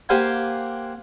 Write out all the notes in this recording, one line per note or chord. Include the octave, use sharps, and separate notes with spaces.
A#3 G4 C5 F5 F#5 G#5